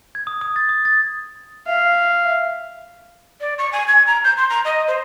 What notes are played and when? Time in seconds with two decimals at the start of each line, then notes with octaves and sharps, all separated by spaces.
0.15 G#6
0.27 D#6
0.41 D#6
0.56 A6
0.69 D#6
0.85 A6
1.67 E5 F5
3.40 D5
3.58 C#6
3.72 G#5
3.88 G#6
4.07 A#5
4.24 G6
4.37 C6
4.50 A#5
4.65 D#5
4.88 C5